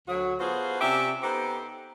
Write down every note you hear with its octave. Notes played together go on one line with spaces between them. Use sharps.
D2 F#3 F#4
B3 F4 F#4 G#4 A4 C5
C3 C#4 G4 D5 E5
B3 D#4 G4 A4 C5